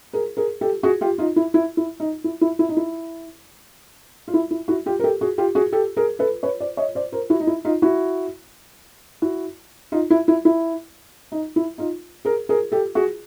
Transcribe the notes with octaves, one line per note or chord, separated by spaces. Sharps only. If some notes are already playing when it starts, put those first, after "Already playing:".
G#4 A#4
G#4 A#4
G4 A4
F#4 G#4
F4 G4
D#4 F4
E4
E4
E4
D#4
E4
E4
E4
D#4
E4
F4
E4
E4
E4 F#4
F4 G4
A#4
G4 A4
F#4 G#4
F4 G4
F#4 G#4
G4 A4
G#4 A#4
A4 B4
B4 C#5
C5 D5
C#5 D#5
C5 D5
A#4 C5
E4 F#4
D#4
E4
D#4 F4
E4 F#4
E4 F#4
D#4 F4
E4
E4
E4
D#4
E4
D#4 F4
G#4 A#4
G#4 A#4
G4 A4
F#4 G#4